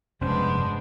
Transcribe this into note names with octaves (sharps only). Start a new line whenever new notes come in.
F1 G2 G#3 B3 C#4 D4 C5